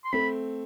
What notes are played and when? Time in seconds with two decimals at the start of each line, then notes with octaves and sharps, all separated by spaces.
0.04 C6
0.13 A3 C4 B5